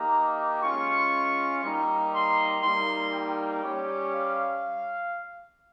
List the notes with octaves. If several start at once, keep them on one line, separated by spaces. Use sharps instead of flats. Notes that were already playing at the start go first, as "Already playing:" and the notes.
Already playing: A#3 D#4 G4 A#5
G#3 C#4 F4 C#6
G3 A#3 D#4
C6
G3 A#3 D#4 C6
G5
G3 C#4 G4
F5